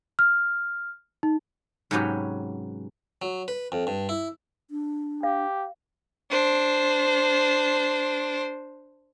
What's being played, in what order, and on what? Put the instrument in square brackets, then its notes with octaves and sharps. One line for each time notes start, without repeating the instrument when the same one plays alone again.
[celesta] F6
D#4
[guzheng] G#2 C3 F#3 B3 C#4 G4
[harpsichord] F#3
B4
F2
G2
E4
[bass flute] D4
[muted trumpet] G4 [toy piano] F5
[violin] D4 C5